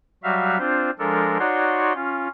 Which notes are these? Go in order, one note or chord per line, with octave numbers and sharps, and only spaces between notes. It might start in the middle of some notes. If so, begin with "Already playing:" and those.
F#3 G3 F#4 E5 F5
C4 D4 F4 C5
F3 G#3 D4 A4 A#4
D#4 F#4 C#5 D5 F#5 C6
C#4 F4